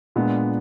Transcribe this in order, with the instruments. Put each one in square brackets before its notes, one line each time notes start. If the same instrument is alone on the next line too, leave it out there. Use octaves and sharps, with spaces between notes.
[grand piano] A#2 G#3 B3 D4